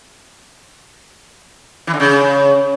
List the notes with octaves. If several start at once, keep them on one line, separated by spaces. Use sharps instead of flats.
E3
D3
C#3